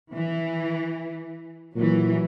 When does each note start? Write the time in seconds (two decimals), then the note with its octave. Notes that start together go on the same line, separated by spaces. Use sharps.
0.13 E3
1.76 A#2 E3 F#3